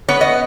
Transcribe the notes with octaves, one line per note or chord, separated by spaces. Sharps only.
B3 C#5
D#5